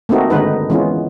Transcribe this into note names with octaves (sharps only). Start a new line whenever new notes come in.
A3 A#3 C4 D#4 F#4
D3 D#3 G#3 D#4 B4
E3 G#3 B3 C#4 F4